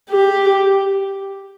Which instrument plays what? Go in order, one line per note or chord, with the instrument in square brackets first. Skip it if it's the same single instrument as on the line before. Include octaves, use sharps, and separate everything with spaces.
[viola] G4